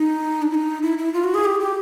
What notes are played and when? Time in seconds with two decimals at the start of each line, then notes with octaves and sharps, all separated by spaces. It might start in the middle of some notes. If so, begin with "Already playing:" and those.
Already playing: D#4
0.42 D4
0.51 E4
0.55 D#4
0.83 E4
0.98 E4
1.14 F4
1.24 F#4
1.34 G#4
1.45 G4
1.60 G4